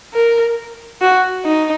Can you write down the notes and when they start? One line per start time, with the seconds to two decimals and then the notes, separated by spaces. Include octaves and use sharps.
0.14 A#4
1.02 F#4
1.46 D#4